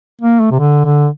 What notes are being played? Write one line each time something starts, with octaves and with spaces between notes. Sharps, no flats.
A#3
A3
C3
D3
D3